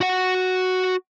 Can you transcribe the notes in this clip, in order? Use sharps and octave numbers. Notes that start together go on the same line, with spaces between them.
F#4 F#5